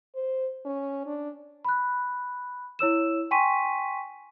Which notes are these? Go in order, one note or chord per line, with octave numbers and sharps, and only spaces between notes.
C5
C#4
D4
B5 F#6
E4 C#5 E6 E7
G5 G#5 C6 C#6 B6 D#7